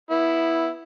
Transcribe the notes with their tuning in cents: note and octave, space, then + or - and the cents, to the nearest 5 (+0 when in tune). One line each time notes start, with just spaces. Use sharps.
B3 -10 E4 +0